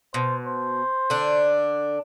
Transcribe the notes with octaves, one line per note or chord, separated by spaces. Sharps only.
B2 C5
C5
D3 D4